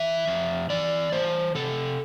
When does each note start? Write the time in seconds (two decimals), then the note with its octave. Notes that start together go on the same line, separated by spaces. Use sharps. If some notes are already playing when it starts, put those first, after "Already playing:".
Already playing: E3 E5
0.27 F2
0.70 E3 D5
1.12 E3 C5
1.55 C3 A4